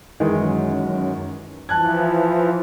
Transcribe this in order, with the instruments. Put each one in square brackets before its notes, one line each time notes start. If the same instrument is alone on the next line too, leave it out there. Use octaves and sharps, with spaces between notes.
[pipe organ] F#2 [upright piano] D#3 E3 G#3
[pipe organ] E3 F3 [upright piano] A5 F#6 G#6